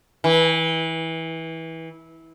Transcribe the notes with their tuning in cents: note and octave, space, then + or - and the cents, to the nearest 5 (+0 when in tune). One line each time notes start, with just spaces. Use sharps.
E3 -20